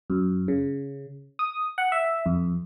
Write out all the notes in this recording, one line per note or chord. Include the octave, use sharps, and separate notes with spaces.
F#2
C#3
D#6
F#5
E5
F2